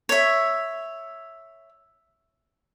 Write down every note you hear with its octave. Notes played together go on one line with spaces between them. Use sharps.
C#5 E5